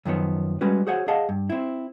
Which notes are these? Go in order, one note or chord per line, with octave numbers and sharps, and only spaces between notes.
F#2 D#3 F3 B3 C#5
G3 G#3 C#4 F#4 B4
F#4 G#4 C5 C#5 F#5
G#4 D#5 F5 F#5 A5
G2
C4 E4